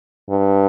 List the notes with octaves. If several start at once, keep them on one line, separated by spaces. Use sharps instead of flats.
G2